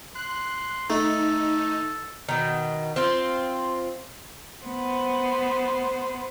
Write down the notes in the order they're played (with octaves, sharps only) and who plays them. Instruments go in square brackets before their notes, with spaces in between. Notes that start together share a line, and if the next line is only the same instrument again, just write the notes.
[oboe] C6 [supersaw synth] F#6
[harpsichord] A3 [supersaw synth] D#4 [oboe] A4
[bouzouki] B2 D#3
C4 F4
[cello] B3 C5